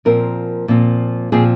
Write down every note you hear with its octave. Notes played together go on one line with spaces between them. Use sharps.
A#2 F3 C4 A#4
A#2 F3 C4
A#2 F3 C4 G#4